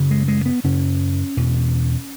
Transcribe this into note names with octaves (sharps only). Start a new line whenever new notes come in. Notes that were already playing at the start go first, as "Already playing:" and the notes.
Already playing: F#2 C#3
G#3
G#3
B3
F#2 C#3 C#4
E2 B2